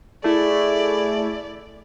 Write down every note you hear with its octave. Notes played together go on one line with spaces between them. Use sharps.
A3 E4 G#4 D5